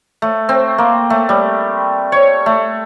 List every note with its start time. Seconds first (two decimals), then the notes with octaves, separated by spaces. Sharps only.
0.22 A3
0.49 C4
0.78 A#3
1.10 A3
1.29 G3
2.12 C#5
2.46 A3